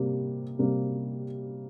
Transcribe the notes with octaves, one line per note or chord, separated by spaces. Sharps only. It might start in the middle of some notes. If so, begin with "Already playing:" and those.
Already playing: C3 G3 A#3
C3 G3 A#3